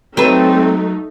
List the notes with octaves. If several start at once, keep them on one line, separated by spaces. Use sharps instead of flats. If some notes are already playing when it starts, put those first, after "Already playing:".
F#3 A3 C4 D#4 B4